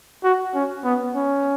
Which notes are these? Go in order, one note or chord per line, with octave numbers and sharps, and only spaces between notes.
F#4
C#4
B3
C#4